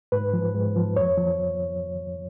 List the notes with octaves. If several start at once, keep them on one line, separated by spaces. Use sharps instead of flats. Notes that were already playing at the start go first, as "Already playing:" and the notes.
G#2 B4
F3
G#2
F3
F2 C#5
F3